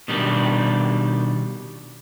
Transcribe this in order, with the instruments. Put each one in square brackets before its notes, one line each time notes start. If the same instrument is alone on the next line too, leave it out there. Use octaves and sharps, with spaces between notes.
[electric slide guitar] B2 D#3 G3 D4